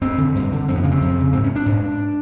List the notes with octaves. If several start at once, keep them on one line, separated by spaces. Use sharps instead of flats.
G2 C4
D3
G2
D3
F2 C4
B3
C#3 A#3
C4
F2
C#3
G#2 C4
C#4
D4
G#2